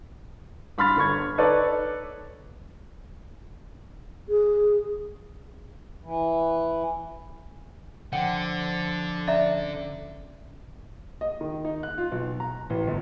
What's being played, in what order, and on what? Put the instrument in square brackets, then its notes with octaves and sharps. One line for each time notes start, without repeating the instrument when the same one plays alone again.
[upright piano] G2 B5 C6 F6 A6 B6
G1 D3 C#6 G#6
D#4 A4 B4 C#5 D5
[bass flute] G#4
[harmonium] E3
[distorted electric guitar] D3 [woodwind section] F3 [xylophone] F#5 [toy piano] G5
[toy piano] C#4 E5 A#5 [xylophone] D5
[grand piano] D#5
D#3
D#4
F#6
F4
B1
A#5
A1
G1